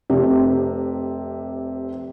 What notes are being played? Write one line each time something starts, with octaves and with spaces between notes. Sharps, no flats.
F1 C3